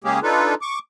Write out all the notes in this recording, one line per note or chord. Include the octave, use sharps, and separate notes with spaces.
C#3 G#3 A#3 C#4 G4 G#4
D4 D#4 F4 A4 B4
C#6 D6